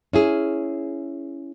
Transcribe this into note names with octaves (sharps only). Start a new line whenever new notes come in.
C#4 E4 G#4